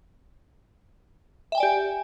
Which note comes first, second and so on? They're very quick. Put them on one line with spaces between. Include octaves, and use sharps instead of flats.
E5 G5 G#5 D5 G4